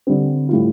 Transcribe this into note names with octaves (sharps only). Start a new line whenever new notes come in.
D3 G3 C4
A2 G3 F4